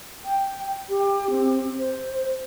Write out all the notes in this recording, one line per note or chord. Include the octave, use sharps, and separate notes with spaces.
G5
G4
C4
C5